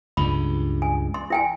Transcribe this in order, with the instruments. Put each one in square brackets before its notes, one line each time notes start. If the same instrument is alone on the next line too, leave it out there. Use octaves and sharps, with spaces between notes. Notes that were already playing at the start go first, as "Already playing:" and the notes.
[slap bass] C#2 G2 [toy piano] B5
[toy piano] G#5
C6
E4 G5 G#5